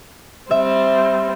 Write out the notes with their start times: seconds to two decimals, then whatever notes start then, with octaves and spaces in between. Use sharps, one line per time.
0.51 G3 C4 E5